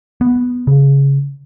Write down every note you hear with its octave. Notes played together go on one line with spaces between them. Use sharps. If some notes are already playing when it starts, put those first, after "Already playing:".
B3
C#3